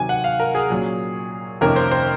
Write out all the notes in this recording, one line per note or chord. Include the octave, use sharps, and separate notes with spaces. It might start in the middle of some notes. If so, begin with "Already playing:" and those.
Already playing: C3 D#3 F#3 G#5
F#5
F5
A#4
G#4
A#2 F#3 C#4
F2 C3 D#3 A#3 C#4 A#4
C5
C5